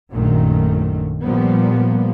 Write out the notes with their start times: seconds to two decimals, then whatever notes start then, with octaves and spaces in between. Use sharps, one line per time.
0.11 A#1 F#2 A#2 D#3 A3
1.22 A#2 F3 G3 A#3 B3